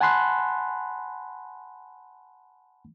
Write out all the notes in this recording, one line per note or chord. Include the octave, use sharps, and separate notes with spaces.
F#5 G#5 A5 B5 C6 F#6